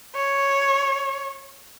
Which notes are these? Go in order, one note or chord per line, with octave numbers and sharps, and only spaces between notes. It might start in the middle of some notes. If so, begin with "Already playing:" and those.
C#5